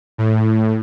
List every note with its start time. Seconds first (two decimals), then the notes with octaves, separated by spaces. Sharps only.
0.18 A2